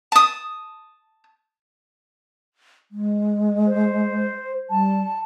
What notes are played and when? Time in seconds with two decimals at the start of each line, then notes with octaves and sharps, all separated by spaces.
0.12 A5 D#6
2.91 G#3
3.67 C5
4.70 G3 A5